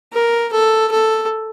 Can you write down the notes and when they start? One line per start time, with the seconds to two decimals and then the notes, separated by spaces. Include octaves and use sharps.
0.13 A#4
0.52 A4
0.91 A4